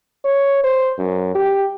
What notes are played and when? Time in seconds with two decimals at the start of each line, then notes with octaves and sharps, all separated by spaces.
0.25 C#5
0.64 C5
0.98 F#2
1.35 G4